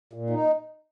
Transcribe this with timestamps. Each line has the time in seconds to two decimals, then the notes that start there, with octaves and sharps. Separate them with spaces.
0.13 A#2
0.30 D#4